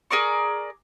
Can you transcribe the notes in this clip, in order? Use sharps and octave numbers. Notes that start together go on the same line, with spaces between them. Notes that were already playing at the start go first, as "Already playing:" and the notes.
G#4 A#4 D5 C#6